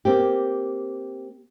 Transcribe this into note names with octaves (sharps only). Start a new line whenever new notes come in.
A#3 C4 G4